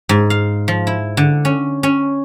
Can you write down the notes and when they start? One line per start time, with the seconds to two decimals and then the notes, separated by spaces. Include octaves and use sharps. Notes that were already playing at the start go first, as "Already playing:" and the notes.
0.09 G#2
0.30 F5
0.68 F3
0.87 E4
1.17 D3
1.45 C#4
1.83 C#4